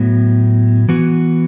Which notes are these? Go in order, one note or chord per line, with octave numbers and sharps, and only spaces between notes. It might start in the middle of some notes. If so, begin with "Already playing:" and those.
Already playing: A2 F#3 B3
E3 B3 F#4